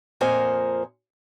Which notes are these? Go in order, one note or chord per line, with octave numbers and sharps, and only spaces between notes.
F2 A#2 A#4 C5 D#5 G#5